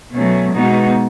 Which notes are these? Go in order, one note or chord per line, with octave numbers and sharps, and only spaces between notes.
B2 F#3 A3 C#4
B2 G#3 B3 D#4 F#4